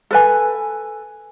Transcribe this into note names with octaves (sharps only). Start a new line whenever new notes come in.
A4 B4 G#5